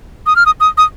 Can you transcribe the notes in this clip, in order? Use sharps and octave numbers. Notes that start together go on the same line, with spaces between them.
D#6
F6
D#6
D#6
D#6